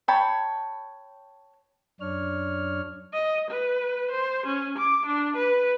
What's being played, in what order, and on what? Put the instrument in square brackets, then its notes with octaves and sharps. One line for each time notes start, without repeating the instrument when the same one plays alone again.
[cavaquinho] C#5 G5 A5 B5
[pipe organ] F#2 D4 C#5 F6
[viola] D#5
B4
C5
C#4
D6
D4
B4